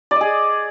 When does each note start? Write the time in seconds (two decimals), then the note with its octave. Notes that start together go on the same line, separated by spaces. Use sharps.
0.11 D5
0.16 D#5
0.21 G#4